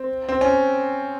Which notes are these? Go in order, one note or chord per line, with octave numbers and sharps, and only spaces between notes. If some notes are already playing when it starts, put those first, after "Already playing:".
Already playing: C4
C4
C#4